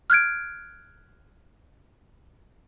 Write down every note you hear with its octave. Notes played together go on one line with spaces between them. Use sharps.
F6 F#6 G#6 D7